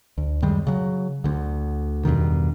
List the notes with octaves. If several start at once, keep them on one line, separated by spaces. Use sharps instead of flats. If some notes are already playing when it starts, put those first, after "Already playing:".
D2
F#2 D#3 G3 G#3
C#3 F#3
D2 D3
E2 G2 B2 D#3